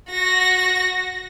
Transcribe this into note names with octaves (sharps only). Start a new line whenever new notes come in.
F#4 A#6